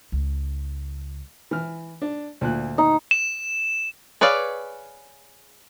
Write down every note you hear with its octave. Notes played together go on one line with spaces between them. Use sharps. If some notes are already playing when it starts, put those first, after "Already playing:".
C#2
E3 F6
D4
D2 A#2 F#6
D#4
E7
G#4 B4 C#5 D5 F5